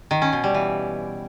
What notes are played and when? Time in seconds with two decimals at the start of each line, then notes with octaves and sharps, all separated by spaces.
0.11 D#3
0.22 C#4
0.33 B2
0.44 G3
0.55 E3